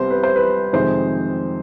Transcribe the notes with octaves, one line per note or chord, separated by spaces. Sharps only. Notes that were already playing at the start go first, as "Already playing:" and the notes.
Already playing: C2 C3 G3 B3 C5
B4
C5
B4
F2 C3 D#3 G#3 C5